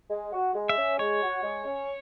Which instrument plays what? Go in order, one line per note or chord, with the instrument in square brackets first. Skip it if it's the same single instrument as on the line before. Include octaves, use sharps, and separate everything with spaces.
[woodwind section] G#3
F#4
G#3
[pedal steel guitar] E5
[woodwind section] C#4
[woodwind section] G#3 [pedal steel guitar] C#5
[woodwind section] F#4
G#3
C#4